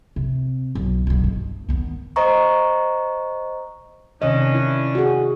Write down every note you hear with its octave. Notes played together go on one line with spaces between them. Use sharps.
C3
B1
B1 B2
G2
D#3 B3
C5 D#5 A#5 C#6
C3 D#3 C#4 D4 D#5
E4
F#4 G#4